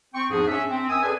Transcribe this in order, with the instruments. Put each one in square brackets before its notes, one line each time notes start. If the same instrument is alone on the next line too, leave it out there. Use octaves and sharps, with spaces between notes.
[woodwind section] C4 G5 C#6
E2 G#2 F3 D4 G#4
C#4 D4 E5
C4
F#2 G#5 D#6 E6
G#4 A4 B4 D5 G#5